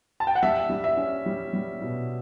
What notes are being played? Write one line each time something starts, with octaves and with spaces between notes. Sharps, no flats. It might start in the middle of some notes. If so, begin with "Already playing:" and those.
A5
G5
F#5
G3 E5
G3
E5
C#4
G3
G3
B2